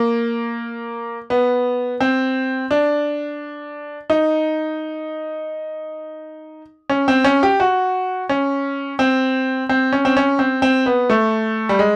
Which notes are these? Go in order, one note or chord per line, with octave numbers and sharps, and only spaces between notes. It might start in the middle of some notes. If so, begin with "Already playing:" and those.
Already playing: A#3
B3
C4
D4
D#4
C#4
C4
C#4
G4
F#4
C#4
C4
C4
C#4
C4
C#4
C4
C4
B3
A3
G3
G#3